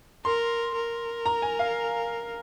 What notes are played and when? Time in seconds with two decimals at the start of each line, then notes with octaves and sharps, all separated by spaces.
0.25 A#4 C6
0.75 A#4
1.26 A#5
1.42 G#5
1.59 F5